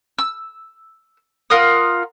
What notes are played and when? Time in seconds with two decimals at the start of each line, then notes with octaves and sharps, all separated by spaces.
0.19 E6
1.50 F4 A#4 F#5 D#6